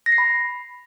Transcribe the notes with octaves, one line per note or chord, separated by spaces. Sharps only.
A#6
C7
B5